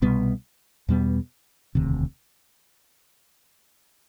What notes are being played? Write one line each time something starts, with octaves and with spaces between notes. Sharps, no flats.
C2 B2 G3 B3
E2 B2 G3 B3
E1 D2 C3 D#3